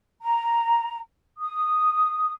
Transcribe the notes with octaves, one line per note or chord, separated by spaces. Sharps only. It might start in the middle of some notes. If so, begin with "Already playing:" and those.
A#5
D#6